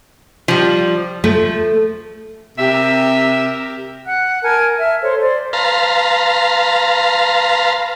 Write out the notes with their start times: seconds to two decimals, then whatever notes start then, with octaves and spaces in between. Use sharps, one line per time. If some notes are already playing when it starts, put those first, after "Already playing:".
0.48 F3 G3
1.24 F3 A3
2.58 C3 G4 A#4 E5
4.06 F#5 F#6
4.43 A#4 G#5 A5 F6
4.77 E5 F6
5.02 A4 C5 C#5
5.21 C5 D5
5.53 B4 F5 A5 A#5 C6